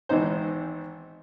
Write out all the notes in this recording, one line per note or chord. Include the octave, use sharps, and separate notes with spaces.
G#1 E3 B3 D#4 C5